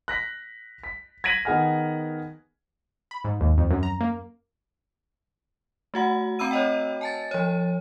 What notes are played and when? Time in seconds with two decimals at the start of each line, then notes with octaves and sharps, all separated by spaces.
0.08 F#6 A#6 B6
0.84 B6
1.24 G#6 A#6 B6 D#7 F#7
1.45 D#3 B3 G#4 F#5 G#5 F6
3.11 B5
3.24 G#2
3.41 D#2
3.58 F2
3.71 F#2
3.83 A#5
4.01 A#3
5.94 A3 F#4 F#5
6.39 C4 A#5 B5 E6 D#7
6.51 C#5 D#5 G5
7.01 G#5 A5 A6
7.31 F3 C#5